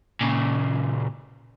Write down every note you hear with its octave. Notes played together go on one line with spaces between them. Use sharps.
A#2 C#3